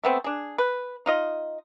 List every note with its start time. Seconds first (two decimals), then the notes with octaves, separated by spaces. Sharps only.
0.04 A3 B3 C4
0.24 D4 G#4
0.58 B4
1.06 D#4 F4 D#5